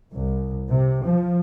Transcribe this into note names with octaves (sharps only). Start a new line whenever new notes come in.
C2
C3
F3